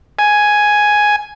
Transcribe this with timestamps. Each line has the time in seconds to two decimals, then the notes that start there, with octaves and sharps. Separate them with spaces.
0.19 G#5